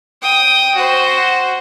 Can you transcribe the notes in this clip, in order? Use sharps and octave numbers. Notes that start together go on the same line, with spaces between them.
G5 D#6
F#4 C5